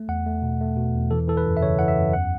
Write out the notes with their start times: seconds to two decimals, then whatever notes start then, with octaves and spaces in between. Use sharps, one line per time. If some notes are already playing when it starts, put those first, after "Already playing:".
Already playing: A3
0.09 E2 F#5
0.26 A3
0.42 B2
0.61 A3
0.77 B2
0.94 E2
1.11 E3 A4
1.28 E3 A4
1.37 B4
1.45 F#2
1.57 E5
1.62 C#3 C#5
1.79 E3 F#5
1.88 E5
1.97 F#2
2.13 E2 F#5